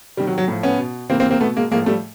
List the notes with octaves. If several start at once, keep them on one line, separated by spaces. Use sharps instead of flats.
C3 D#3 G3
F#3
F#3
A2 F3
B3 C#4
B2
C3 E3 A#3 C4
A#3 C4
A#3 C4
B2 A3 B3
G#3 A#3
A2 F3 G#3 A#3
G3 A3